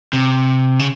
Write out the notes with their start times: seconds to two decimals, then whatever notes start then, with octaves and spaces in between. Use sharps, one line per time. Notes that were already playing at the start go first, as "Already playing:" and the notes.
0.13 C3
0.79 C#3